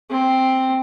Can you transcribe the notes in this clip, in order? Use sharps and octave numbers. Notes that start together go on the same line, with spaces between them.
C4